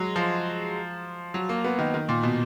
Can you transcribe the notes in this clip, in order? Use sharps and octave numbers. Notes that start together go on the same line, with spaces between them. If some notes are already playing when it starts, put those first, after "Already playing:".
Already playing: F#3 G#3
F3
F#3
A#3
B3
D#3
D#3
A#2
B2